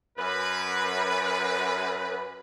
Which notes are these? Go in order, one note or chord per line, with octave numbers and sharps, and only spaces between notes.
F#2 B4